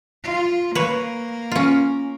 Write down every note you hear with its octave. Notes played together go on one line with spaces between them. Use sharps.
F4
A#3 B4 C#5
C#4 F4